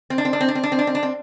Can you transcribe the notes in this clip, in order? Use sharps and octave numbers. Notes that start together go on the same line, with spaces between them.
C4
D4
C4
D4
C4
D4
C4
D4
C4
D4
C4
D4
C4